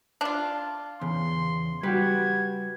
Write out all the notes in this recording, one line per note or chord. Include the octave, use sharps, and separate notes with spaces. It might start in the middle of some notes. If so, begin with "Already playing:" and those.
D4 F4
E2 C#3 C6
G3 F#4 G4 B4 G#6